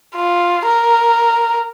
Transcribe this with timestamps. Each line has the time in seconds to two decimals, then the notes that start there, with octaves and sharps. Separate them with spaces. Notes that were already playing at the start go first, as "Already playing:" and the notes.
0.16 F4
0.66 A#4